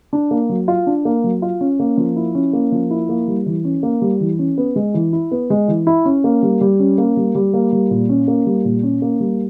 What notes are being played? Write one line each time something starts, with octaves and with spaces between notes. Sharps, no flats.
D4
A#3
F#3
F4
D4
A#3
F#3
F4
C#4
A#3
F3
E4
C#4
A#3
F3
E4
A#3
G3
E3
C#4
A#3
G3
E3
C#4
B3
G#3
E3
E4
B3
G#3
E3
E4
C#4
A#3
G3
G3
C#4
A#3
G3
G3
A#3
G3
A#2
C#4
A#3
G3
A#2
C#4
A#3
G3